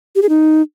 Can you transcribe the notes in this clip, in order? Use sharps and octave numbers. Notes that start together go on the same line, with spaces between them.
G4
G#4
D#4